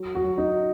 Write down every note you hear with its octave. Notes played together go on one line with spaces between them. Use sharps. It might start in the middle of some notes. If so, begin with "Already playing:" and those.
Already playing: F#3
F#4
F#3
D#4